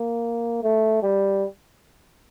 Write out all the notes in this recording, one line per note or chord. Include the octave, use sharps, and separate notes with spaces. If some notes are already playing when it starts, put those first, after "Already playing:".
Already playing: A#3
A3
G3